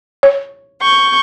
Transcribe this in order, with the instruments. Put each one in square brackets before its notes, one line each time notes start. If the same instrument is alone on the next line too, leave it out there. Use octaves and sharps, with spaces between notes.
[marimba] C#5
[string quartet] C#6 G6